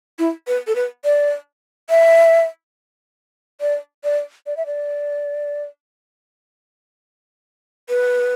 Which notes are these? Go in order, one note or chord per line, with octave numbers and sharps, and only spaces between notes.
E4
B4
A4
B4
D5
E5
D5
D5
D5
E5
D5
B4